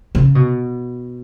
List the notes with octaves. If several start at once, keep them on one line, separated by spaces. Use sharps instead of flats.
C#3
B2